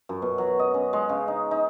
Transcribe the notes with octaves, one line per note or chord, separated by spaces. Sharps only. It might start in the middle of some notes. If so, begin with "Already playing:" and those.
F#2
B2
F#3
D#5
C#4
G#3
C#3
D#4
D#4